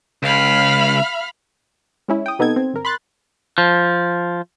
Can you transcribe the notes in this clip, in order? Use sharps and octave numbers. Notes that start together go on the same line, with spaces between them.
C#2 F5 B5 F6
G#3 C#4 E4
G5 D#6
C3 B3 D#4 A4 G#6
C4
G1 A#4
B5 C6 F#6 A6
F3